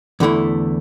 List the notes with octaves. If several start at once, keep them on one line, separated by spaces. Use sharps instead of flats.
E2 D3 A3 E4